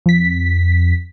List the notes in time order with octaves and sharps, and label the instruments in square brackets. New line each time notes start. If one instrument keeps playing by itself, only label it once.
[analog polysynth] F2 B6